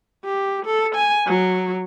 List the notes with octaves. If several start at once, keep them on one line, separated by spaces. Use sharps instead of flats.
G4
A4
G#5
F#3